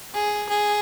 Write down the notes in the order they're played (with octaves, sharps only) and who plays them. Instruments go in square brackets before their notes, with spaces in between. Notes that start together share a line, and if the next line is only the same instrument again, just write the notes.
[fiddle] G#4
G#4